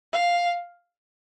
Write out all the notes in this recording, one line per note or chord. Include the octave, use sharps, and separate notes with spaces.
F5